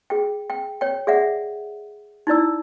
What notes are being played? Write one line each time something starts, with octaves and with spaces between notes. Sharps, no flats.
G#4 G5
G5
C#5 G5
G#4 D5 E5 F#5
D#4 E4 D5 E6